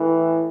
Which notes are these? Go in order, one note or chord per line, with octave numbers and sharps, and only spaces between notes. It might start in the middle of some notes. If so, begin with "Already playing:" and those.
Already playing: A2 E3